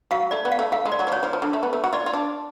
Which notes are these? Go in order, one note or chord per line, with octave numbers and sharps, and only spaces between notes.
F#3 F5
A3 D5
B3
F5
A3
A3 F5
G#3
D5
F#3
F3
F#3 C#5
F3
F3
D3
A3
B3
A3
F#4
F4 D5
F4
D4